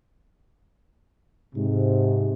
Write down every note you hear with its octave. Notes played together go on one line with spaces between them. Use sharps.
G#2 C3